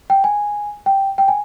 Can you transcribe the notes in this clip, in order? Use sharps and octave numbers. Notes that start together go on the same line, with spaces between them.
G5
G#5
G5
G5
G#5